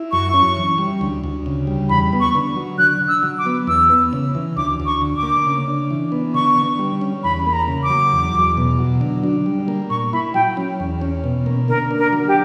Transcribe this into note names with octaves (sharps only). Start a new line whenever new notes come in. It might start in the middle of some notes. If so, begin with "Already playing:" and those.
Already playing: E4
F#2 C#6
C#4
E3
G3
D2
D2
C#3
G3
E2 B5
B3
C#6
D3
F#3
D3 F#6
D3
E6
F#3
D6
B3
E2 E6
B3
C#3
E3
D2 D6
D2
C#6
D3
D6
A#3
C#3
D4
E3
B3
D3 C#6
D3
G3
C#4
E2 B5
A#3 B5
A#5
C#3
D6
F#3
E2
E2
B2
F#3
D3
D4
G3
A#3
A#2 C#6
E4 B5
F#3 G5
C#4
E2
C#4
B2
A#3
D3 A#4
D4
A#4
F#3
G4